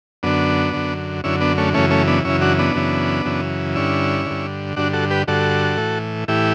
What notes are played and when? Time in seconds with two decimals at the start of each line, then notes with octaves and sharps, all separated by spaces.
0.23 F#2 D3 B3 D4
0.73 F#2 D3
1.24 F#2 D3 C#4 E4
1.41 B3 D4
1.58 A3 C#4
1.74 F#2 C#3 E3 A3 C#4
1.91 A3 C#4
2.07 B3 D4
2.25 F#2 C#3 E3 C#4 E4
2.41 D4 F#4
2.58 B3 D4
2.75 F#2 C#3 E3
3.25 F#2 C#3 E3
3.76 G2 D3 C#4 E4
4.26 G2 D3
4.76 G2 D3 D4 F#4
4.93 F#4 A4
5.11 G4 B4
5.28 G2 D3 F#4 A4
5.77 A2 E3
6.28 A2 E3 E4 G4